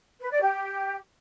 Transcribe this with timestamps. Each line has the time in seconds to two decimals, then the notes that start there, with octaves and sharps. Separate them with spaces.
0.20 B4
0.31 D5
0.42 G4